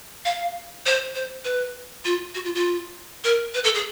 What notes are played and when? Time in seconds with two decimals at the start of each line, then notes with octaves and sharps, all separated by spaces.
0.25 F5
0.86 C5
1.15 C5
1.45 B4
2.05 F4
2.35 F#4
2.45 F4
2.55 F4
3.24 A#4
3.54 B4
3.64 A4
3.75 G#4